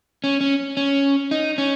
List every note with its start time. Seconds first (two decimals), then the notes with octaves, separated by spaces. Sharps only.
0.24 C#4
0.41 C#4
0.77 C#4
1.31 D#4
1.58 C#4